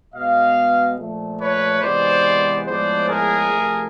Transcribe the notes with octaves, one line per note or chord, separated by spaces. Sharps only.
B2 G#3 B3 D#5 F5
A#2 F3 A3
B4 C#5
C3 E3 G#3 B3 C5 D5
A2 F3 G#3 B3 C5 D5
G#4 A#4
C3 F3 A3